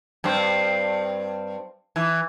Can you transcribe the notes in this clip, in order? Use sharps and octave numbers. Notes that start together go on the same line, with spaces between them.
G2 C4
E3